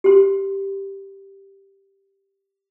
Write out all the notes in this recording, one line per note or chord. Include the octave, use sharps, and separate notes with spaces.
G4 C6